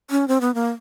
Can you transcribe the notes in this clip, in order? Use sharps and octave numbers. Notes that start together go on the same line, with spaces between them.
C#4
C4
B3
A#3